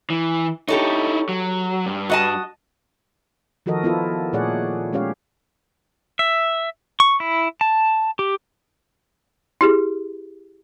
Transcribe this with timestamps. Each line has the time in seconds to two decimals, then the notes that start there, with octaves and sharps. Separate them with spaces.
0.10 E3
0.68 D#4 E4 G4 A4 C#5
1.29 F#3
1.86 G2
2.10 F#4 D#5 A5
3.66 D#3 F3 F#4 A4 A#4 D#5
3.83 B3 E4 F4 A4
4.33 A#2 A3 G#4 C#5 D5 F#5
4.93 G#3 C#4 G4 C#5 F5
6.19 E5
7.00 C#6
7.20 E4
7.61 A5
8.19 G4
9.61 E4 G4 G#4